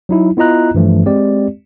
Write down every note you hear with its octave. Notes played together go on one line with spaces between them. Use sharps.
F#3 D#4 E4
B3 E4 F4 D#5 A#5 F#6
G2 E3 F3 A3
G#3 C4 G4 D5